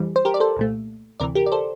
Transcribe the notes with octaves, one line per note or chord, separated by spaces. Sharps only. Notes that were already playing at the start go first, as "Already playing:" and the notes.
Already playing: F2 E3 G3
C5
G4 A#4
D5
A4 C5
C2 A#2 A3
D2 C3 E3 A#4 D5
G4 A#4
D5
A4 C5